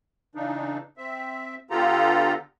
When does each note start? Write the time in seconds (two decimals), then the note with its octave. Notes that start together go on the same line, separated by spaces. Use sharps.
0.35 C#3 E3 D4 D#4
0.97 C4 E5
1.70 D3 B3 F4 G4 A4 A#5